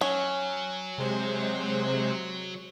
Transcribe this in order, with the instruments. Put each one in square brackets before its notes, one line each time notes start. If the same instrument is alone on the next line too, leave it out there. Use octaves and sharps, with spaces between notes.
[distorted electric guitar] F#3 [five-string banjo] C#4
[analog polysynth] C3 G#3 C5